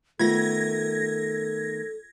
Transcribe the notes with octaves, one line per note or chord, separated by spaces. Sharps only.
D#3 A3 B3 F4 A4 G#6 A#6